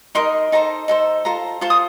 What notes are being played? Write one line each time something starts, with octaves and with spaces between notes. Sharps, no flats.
D#4 A#4 D#5 C6
D#4 A4 C5 A#5
D#4 A4 C5
F4 A4 C5 A#5
F4 A4 C5 C6
D#6